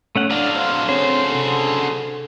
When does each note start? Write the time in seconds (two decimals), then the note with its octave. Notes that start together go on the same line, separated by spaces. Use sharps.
0.16 A3 C#4 F#5
0.31 D3 F#3 D4 F5
0.56 F2 C5
0.89 C4 C#4 G#4 C5 C#5
1.31 C3 A4